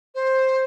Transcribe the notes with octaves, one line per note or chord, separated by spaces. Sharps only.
C5